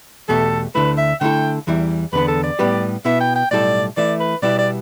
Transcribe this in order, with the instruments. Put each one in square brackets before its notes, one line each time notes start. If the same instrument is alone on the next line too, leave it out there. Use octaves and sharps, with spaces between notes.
[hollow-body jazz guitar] E2 B2 A3 G4 [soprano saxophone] A4
[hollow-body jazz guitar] D2 D3 A3 E4 [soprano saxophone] B4
[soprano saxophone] E5
[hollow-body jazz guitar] D3 A3 E4 A4 [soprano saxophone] G5
[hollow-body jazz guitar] E2 E3 G3 E4
[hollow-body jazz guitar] E2 D3 B3 [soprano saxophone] B4
[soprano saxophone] A4
D5
[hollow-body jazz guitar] A2 G3 B3 G4 B4
[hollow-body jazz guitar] B2 B3 E4 [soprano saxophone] E5
[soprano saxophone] G5
G5
[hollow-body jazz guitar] B1 A2 G3 E4 A4 [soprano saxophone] D5
[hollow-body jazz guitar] E3 A3 E4 [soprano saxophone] D5
[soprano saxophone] B4
[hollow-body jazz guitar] B2 G3 B3 E4 G4 [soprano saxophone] D5
[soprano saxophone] D5